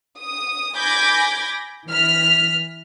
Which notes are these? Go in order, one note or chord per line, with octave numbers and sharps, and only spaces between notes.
D#6
G#5 B5 D6 G6 G#6 A#6
E3 F6 B6